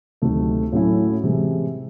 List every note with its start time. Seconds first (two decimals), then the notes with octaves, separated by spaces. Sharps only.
0.22 D2 C3 D#3 F#3 A3
0.72 A2 F#3 A3 C#4 E4
1.24 C3 E3 G#3